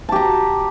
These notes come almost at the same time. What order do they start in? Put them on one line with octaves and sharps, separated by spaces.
A5 G4 A#5